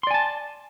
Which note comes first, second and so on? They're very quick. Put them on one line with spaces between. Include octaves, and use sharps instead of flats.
C6 D5 G#5 A5